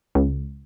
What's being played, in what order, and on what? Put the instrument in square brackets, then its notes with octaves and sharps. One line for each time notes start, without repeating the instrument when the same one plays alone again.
[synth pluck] C#2